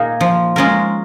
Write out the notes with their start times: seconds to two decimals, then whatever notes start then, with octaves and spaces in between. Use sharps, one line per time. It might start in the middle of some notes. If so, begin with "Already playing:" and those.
Already playing: A#2 A#3 D#4 G#4
0.21 F3
0.56 G#3 C#4 F4 A#4